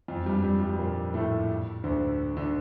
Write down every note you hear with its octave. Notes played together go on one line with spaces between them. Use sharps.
F2 F3
G2 G3
G2 G3
G2 G3
A#2 A#3
A2 A3
D2 D3
D3